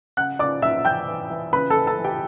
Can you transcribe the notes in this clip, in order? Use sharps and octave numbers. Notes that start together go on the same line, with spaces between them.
C#3 F#5 F#6
C#3 D5 D6
C#3 E5 E6
E3 G5 G6
E3
E3
C#3 B4 B5
A4 A5
E3
A4 A5
E3
G4 G5